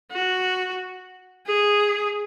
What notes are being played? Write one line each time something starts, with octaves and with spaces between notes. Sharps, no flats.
F#4
G#4